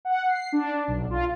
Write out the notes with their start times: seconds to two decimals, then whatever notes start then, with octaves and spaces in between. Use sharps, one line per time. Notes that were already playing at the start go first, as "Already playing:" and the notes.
0.05 F#5
0.29 C7
0.52 D4
0.88 B1
1.10 F4